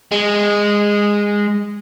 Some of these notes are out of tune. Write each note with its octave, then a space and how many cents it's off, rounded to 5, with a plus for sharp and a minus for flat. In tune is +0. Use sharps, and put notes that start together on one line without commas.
G#3 -15